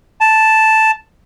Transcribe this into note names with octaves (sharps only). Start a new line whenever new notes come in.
A5